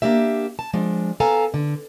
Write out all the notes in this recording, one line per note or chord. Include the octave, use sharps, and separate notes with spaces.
A#3 D4 G4 E5
A5
F3 G#3 D4
B3 A4 F5 G#5 A#5
D3